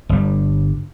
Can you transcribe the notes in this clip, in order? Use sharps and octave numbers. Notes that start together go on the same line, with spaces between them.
G1 G3